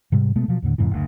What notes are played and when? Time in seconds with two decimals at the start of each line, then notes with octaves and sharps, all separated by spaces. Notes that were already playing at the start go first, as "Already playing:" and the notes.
0.12 G#2 C3 G3
0.36 B2 G#3 A3 B3
0.48 B2 F3 F#3
0.62 D#2 A2 D3
0.78 F2 G#2 C3 E3
0.91 F#1 D2